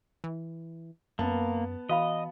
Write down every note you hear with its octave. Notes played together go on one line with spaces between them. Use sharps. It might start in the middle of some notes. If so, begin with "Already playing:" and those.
E3
F#2 A#3 B3 A5
E3 F#4 D#5 F5 B5